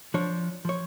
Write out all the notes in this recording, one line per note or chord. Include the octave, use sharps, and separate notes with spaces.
F3 D4 C#5
F3 C#5